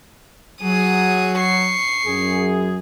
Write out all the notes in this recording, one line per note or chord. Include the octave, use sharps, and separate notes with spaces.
F#3 G#4 D#6
C#6 C7
F#2 G#4